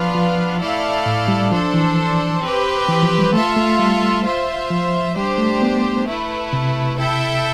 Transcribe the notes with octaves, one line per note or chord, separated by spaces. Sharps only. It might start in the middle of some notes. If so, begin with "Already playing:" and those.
Already playing: F3 B3 D4 F4 B4 F5
F3
A3 E4 A4 D5 F5
A2
G3
F3 D4 A4 C5
E3
C4 G4 B4
E3
F3
G3
A3 F4 A4 E5
A3
G3
F4 C5 E5
F3
G3 D4 G4 C5
A3
B3
A3 E4 B4
C3
E4 A4 E5 G5